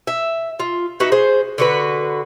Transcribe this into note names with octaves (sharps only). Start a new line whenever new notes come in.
E5
F4
D#4 F#4 B4 E5
G#4 C5
D3 F#4 B4